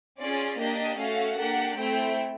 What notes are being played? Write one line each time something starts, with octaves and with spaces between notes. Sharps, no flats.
C#4 F4 G#4 D5
A#3 D4 G4 D#5
A3 C#4 F#4 A4 F5
A#3 D4 G4 F#5
A3 C4 E4 G5